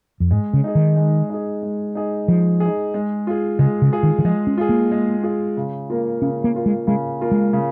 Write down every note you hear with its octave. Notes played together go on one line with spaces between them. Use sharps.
F2
G#2 G#3
C#3
D#4 G#4
D#3
G#3
D#4 G#4
G#3
D#4 G#4
F3 G#3
G#4
D#4
G#3
F4 G#4
C#3 G#3
C#3
F4 G#4
D#3
D#3
F3 G#3
C#4
F4 G#4
A#3
G#3
F4 G#4
C#3
A#3 F4 A#4
C#3 C#4
A#3
A#3 F4 A#4
G#3
C#3 G#3
A#3 F4 A#4
G#3
C#3